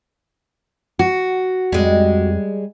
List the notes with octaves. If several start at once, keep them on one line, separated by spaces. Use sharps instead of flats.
F#4
F2 G3 G#3